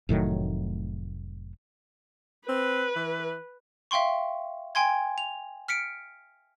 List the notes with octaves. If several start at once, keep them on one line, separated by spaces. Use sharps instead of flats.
F1 A2 D#3 F#3
C4 B4
E3
E5 F5 G5 C6 C#6
G5 G#5 C6 G#6
F7
F6 B6 C#7 D7